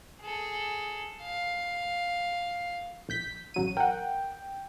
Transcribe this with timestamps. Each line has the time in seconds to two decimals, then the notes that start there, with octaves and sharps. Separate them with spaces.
0.21 G#4 A4
1.22 F5
3.09 A#1 G6 B6
3.54 A1 F#3 D#7
3.77 A#4 F#5 G5